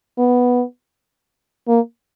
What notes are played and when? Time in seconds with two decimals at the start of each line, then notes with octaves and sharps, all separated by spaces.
0.18 B3
1.68 A#3